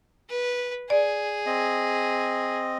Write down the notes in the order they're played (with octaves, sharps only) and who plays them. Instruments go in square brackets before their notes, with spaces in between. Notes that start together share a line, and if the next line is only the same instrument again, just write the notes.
[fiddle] B4
[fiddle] G#4 [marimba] D5
[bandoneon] C4 D#5